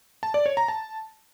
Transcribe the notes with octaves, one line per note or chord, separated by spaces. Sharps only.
A5
D5
C#5
A#5
A5